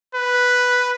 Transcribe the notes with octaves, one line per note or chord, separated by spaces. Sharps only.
B4